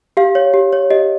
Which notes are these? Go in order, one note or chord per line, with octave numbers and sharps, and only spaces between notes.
G4 F5
C#5
G4
C#5
G4 D#5